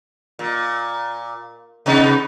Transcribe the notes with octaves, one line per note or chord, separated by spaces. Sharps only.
A#2
C3 B3 D#4